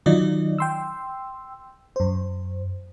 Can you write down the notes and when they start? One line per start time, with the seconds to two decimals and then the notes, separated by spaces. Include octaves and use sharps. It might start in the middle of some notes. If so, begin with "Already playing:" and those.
0.06 D#3 F#3 D#4 F4 D5 D#5
0.58 G5 C6 E6
1.96 F#2 C5